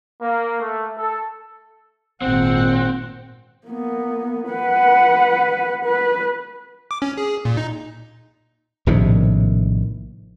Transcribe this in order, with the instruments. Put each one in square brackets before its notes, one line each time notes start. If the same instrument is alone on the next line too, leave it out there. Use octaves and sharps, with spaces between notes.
[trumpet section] A#3
A3
A4
[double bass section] G#1 A#2 [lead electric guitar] C4 [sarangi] F#5
[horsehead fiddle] A#3 B3
B4 F#5
B4
[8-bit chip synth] D6
C#4
G#4
A#2
D#4
[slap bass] A#1 A2 C3 D#3